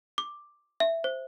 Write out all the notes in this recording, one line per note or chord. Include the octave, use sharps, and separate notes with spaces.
D6
E5
C5